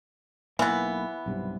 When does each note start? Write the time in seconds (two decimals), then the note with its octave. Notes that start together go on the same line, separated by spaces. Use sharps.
0.59 B1 E3 A#3 B3
1.26 B1 G2 C3